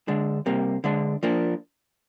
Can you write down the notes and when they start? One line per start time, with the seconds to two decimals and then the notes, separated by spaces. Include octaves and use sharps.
0.08 D3 G#3 D4
0.46 C3 G3 A#3
0.84 D3 G#3 D4
1.23 F3 A#3 D4